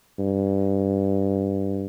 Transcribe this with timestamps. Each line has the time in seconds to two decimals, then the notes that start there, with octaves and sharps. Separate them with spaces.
0.19 G2